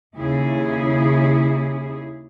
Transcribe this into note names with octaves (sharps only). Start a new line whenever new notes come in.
D#2 C#3 E4 G#4